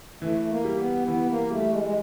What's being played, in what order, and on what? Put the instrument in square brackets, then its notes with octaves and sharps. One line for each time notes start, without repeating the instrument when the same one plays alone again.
[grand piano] E3 [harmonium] A3
[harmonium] A3
A#3
[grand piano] G3
[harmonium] B3
[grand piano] E3 [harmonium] B3
[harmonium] A#3
[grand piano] G3 [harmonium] A3
[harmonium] G#3
G#3